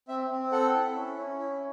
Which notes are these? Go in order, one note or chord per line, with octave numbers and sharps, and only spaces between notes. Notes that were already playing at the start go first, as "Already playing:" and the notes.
C4 E5
C4
A4 F#5
E4
C#4
C#4
E4